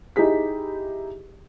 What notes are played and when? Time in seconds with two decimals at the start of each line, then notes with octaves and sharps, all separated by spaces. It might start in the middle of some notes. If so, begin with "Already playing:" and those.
0.16 D#4 E4 G4 G#4 B6